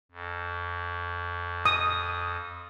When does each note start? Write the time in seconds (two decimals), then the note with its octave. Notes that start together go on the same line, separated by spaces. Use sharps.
0.12 F2
1.66 D#6